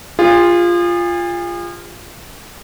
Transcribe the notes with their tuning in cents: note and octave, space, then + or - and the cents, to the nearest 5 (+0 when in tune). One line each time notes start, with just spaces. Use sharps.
F4 -5 G#4 -40